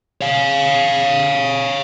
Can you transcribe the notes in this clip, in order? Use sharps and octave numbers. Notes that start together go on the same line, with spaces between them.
C#5 F5